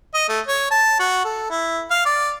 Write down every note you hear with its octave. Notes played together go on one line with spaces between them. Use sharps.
D#5
A3
C#5
A5
F#4
A4
E4
F5
D5